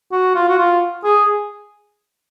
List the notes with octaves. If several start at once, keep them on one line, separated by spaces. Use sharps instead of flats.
F#4
F4
F#4
F4
G#4